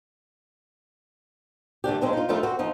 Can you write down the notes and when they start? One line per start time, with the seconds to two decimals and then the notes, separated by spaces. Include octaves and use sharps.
1.84 D3 A3 D4 G4
2.01 A#2 C#3 F3 G#3 C4 D4
2.13 D#4 F4
2.29 F3 G3 A3 D#4 F4 A4
2.43 C4 F#4
2.59 E3 F3 D#4